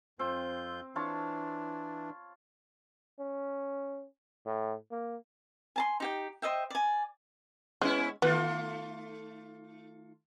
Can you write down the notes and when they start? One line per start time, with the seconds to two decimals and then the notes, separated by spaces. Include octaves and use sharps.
0.19 F2 C4 F4 G6
0.96 E3 D4 F4 C#5 A5
3.19 C#4
4.46 A2
4.91 A#3
5.76 G#5 A5 C6
6.00 D#4 G4 G5
6.42 C5 D#5 E5 G5
6.70 D5 G#5
7.82 G#3 B3 C#4 E4
8.22 D#3 A3 B3 F4